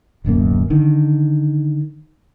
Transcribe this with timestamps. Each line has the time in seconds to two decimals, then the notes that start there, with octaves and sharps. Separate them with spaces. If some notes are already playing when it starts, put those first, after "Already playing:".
0.24 D1 B1 F#2 A#3
0.70 D3 D#3